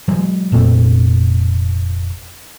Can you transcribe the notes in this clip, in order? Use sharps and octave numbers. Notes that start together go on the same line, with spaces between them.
E3 F#3 G#3
F1 A#2 A3 C4